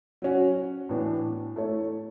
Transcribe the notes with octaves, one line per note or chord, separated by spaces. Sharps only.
F#3 C#4 F#4
A2 E3 B3 D4
A3 E4 A4 C#5